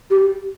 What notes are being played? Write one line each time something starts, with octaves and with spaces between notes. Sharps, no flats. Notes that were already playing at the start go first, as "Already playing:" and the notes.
G4